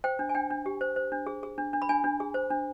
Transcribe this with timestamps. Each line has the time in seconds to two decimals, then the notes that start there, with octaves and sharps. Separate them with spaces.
0.04 C5 G5
0.19 D4
0.29 G#5
0.35 D4 G5
0.50 D4
0.66 G4
0.81 C5
0.96 C5
1.12 D4
1.27 G#4
1.43 G#4
1.58 D4
1.73 D4
1.82 B5
1.89 D4 G#5
2.04 D4
2.20 G#4
2.34 C5
2.50 D4